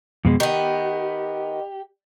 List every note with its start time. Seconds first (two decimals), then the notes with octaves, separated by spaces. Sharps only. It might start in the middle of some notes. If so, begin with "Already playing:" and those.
0.25 F2 B2 G#3
0.40 D#3 B3 G4